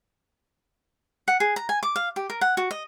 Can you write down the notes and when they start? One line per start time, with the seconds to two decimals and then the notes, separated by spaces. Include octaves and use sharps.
1.28 F#5
1.40 G#4
1.56 A#5
1.69 G#5
1.83 D6
1.96 F5
2.16 G4
2.30 A#4
2.41 F#5
2.57 F#4
2.71 D#5